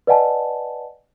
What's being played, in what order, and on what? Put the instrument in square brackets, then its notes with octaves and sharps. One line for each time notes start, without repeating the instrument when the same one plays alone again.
[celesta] B4 D5 D#5 F#5 G#5 A5